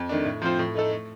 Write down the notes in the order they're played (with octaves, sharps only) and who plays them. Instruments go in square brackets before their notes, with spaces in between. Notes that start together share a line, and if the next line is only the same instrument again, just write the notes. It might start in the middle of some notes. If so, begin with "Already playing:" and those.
Already playing: [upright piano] F2
D#3 A3 D4
A2
F3 C4 F4 C5
A2
A3 D#4 A4
A3